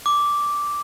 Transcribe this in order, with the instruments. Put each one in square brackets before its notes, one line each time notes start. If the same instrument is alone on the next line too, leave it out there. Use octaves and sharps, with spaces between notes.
[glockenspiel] D6